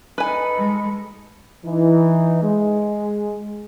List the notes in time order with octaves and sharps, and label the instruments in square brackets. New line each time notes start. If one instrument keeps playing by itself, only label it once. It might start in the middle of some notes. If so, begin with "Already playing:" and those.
[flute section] D#4 A4 B5 [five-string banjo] B4 G#5
[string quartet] G#3
[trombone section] E3 D#4
G#3